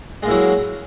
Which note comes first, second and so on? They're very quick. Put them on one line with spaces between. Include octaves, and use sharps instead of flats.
G#3 A#3 E4 F#3